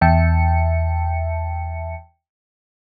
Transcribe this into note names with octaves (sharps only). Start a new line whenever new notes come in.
E2 E5 G5 A5 C#7